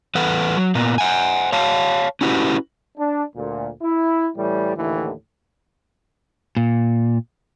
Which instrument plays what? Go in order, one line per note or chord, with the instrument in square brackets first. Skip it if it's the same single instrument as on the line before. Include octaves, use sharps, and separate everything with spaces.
[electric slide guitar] E3 A4 B4 F#5
F#3
A#2 A#3 B3
C5 F#5 G#5
C#5 F5 A5
C#4 E4 F#4 G4 B4
[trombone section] D4
D2 A#2
E4
A2 E3 G3
D#2 A2 D3 E3
[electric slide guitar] A#2